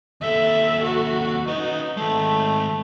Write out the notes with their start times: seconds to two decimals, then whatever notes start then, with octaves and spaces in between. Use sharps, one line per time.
0.21 D#2 A4 E5
0.83 F#4
1.48 C#4 D#4 B4
1.97 D#3 G#3 A3